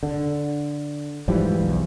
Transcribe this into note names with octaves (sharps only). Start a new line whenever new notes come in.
D3
G#2 E3 F3 G3
B1 E2